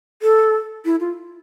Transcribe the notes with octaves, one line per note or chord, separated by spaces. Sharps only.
A4
E4
F4